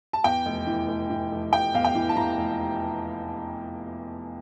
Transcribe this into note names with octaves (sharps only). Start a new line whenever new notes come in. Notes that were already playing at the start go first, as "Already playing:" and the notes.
A5
E2 G5
F1
E3
F1
E3
F1
F1 G5
E2 F5
G5
E3
A5
E3 A#5
F1